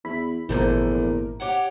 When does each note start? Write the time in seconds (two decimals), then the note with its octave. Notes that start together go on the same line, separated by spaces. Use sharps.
0.05 E2 E4 B5 B6
0.49 G#1 E2 A#2 D3 F3 A3 A#4
1.40 G4 C#5 F#5